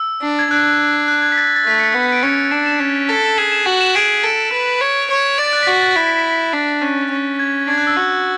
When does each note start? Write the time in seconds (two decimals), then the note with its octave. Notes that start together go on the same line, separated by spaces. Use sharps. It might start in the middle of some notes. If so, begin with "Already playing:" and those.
Already playing: E6
0.22 D4
0.39 G#6
0.51 D4 F#6
1.08 F#6
1.22 G#6
1.32 B6
1.37 A6
1.56 A6
1.65 A3 B6
1.79 C#7
1.94 B3 B6
2.12 D7
2.23 C#4 C#7
2.51 D4 E7
2.66 E7
2.80 C#4 C#7
3.09 A4 B6
3.38 G#4 E7
3.52 E7
3.66 F#4 F#7
3.81 E7
3.95 G#4 D7
4.23 A4 D7
4.52 B4
4.81 C#5
5.10 C#5
5.38 D5 A6
5.53 F#6
5.63 B6
5.68 F#4 A6
5.74 B6
5.82 A6
5.96 E4
6.24 B6
6.53 D4 B6
6.81 C#4 F#6
7.11 C#4
7.39 G#6
7.68 D4 G#6
7.78 F#6
7.87 E6
7.97 F#4